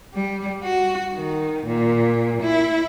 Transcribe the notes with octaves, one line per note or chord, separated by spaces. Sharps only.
G3
F#4
D#3
A#2
E4